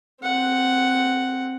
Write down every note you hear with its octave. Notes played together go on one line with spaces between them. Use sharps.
C4 F#5